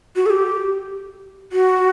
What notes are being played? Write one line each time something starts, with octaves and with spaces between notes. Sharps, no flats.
F#4
A4
G4
F#4